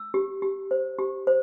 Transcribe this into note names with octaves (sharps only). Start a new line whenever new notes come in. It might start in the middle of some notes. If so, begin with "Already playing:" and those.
Already playing: E6
G4
G4
C5
G4
C5